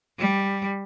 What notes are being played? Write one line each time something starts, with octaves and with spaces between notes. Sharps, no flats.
G3